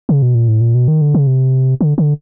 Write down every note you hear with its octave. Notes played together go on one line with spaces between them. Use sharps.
C#3
B2
A#2
A2
A#2
B2
D#3
D3
C#3
C3
D3
D3